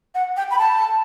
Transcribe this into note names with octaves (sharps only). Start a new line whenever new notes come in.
F#5
G5
B5
A5